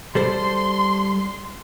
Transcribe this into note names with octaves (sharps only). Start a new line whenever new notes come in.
G3 A4 C5 C6